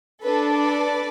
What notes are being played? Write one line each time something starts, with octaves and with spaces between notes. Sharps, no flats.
D4 A4 B4
B4 D5